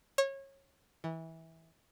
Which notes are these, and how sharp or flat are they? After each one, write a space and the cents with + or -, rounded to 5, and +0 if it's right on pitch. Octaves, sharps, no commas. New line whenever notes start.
C#5 -25
E3 -20